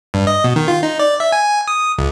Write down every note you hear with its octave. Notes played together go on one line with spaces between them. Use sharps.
G2
D#5
B2
D#3
F4
D#4
D5
E5
G#5
D#6
C#2